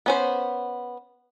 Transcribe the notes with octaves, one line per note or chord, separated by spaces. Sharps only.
B3 C#4 C5